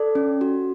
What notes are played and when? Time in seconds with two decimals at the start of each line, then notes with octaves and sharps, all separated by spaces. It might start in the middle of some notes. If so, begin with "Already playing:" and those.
Already playing: A4 D5
0.15 C#4
0.41 F#4